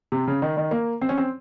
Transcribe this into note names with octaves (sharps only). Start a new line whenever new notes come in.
C3
C#3
D#3
D#3
A#3
C4
C#4
C4